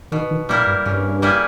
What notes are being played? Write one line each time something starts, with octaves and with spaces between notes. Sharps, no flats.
B2 D#3
D#3
A#2 G3 A#3 E4 A#4
G2
G2 C#3
G3 A#3 E4 G#4